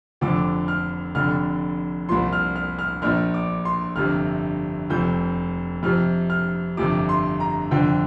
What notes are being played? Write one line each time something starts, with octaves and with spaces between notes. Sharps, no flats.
F1 F2 D3 F3 D6
F6
F1 F2 D3 F6
C2 A#2 F3 C6
F6
F6
F6
A#1 A#2 F3 F6
D6
C6
G1 F2 C3 F6
F1 F2 F3 G6
F2 C3 F3 F6
F6
G1 F2 C3 F3 D6
C6
A#5
G1 F2 D3 F3 G5